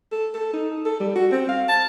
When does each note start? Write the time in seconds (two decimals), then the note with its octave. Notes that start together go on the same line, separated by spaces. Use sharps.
0.12 A4
0.35 A4
0.54 D#4
0.86 A4
1.00 G3
1.16 F#4
1.32 C4
1.49 F5
1.69 A5